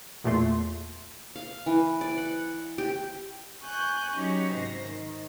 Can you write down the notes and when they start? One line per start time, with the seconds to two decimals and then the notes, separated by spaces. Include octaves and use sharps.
0.24 E2 A#2 A3 C6
1.36 F5
1.66 E3
2.01 D5
2.18 F#5
2.78 G4
3.61 G#5 C#6 F#6 G6
4.14 F#3 C#4 D#4 F#4 G4 C#5
4.53 G#2 C3 C5 A#6
4.84 D#3